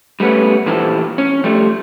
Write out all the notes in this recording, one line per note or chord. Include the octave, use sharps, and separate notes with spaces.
G3 A3 B3 C#4
A#2 E3 F3 G4 A4
C#4
F3 G3 A3